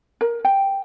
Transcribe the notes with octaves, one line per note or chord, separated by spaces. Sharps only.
A#4
G5